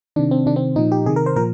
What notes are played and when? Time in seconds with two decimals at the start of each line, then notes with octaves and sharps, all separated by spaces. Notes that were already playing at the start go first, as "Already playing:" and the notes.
0.16 C3 D#3 D4
0.31 C4
0.46 C3 D#3 D4
0.56 C4
0.76 A#2 F3 D#4
0.92 G4
1.06 C3 G#4
1.09 D#3
1.16 A#4
1.26 C5
1.36 A#2 F3 A#4